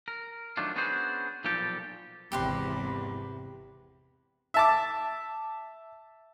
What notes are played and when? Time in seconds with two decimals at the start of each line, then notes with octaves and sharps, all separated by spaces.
0.08 A#4
0.57 D#3 F#3 A3 D4 F4
0.76 B3 C#4 D4 F#4 G#4 C5
1.44 B1 A#2 F3 G3 G4 A4
2.32 G#1 E2 C3 G4 B4 C6
4.54 E5 A5 D6